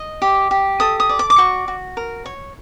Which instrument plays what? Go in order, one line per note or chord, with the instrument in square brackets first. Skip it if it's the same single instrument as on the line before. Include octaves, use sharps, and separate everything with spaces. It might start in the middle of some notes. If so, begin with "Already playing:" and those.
Already playing: [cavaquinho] D#5
G4
G4
A4 D#6
D#6
D5
D6
D6
F#4 C#6
F#4
A#4
C#5